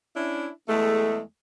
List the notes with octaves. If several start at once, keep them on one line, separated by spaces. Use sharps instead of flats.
C#4 D4 E4
E2 G#3 A3